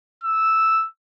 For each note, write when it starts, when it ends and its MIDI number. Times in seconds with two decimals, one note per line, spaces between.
0.24 0.86 88